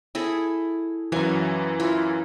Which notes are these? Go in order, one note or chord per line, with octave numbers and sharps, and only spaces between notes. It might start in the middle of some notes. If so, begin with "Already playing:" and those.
E4 G#4 A4
F#2 E3 F#3 F5 G#5
E4 F4